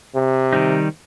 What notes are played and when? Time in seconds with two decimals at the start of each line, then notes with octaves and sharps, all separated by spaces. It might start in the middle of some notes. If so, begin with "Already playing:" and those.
0.15 C3
0.53 D#3 G3 D#4